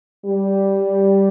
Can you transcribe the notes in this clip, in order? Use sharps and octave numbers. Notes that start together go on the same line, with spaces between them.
G3